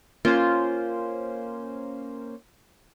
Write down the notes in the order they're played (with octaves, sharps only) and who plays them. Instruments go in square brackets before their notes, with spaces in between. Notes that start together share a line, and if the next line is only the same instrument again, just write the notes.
[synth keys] A#3 C#4 C5 [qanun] F4